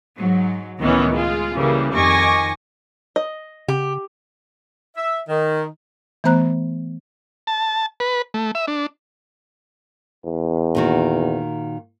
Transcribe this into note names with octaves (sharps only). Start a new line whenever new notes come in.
G#2 F#3
C#2 A2 D#3 E3 B3 C#4
G#3 F4 G#4
C#3 E3 G3 A#3
F2 D#3 G#5 C#6 D6 A#6
D#5
C#3 G4
E5
D#3
E3 A3 B3 C5 A#5 F#6
A5
B4
A3
E5
D4
E2
A#2 D#3 F#4